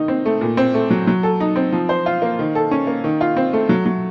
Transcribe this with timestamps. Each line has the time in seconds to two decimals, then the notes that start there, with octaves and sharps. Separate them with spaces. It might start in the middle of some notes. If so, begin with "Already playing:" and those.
Already playing: D#3 D#4
0.08 C4
0.25 A3
0.41 A#2
0.57 C4
0.74 A3
0.91 F#3
1.07 F#3
1.23 A4
1.40 D#4
1.56 C4
1.72 F3
1.89 C5
2.06 F4
2.22 A#3
2.39 D#3
2.55 A4
2.71 C#4
2.87 A#3
3.04 D#3
3.21 F4
3.37 C4
3.53 A3
3.69 F#3
3.86 F#3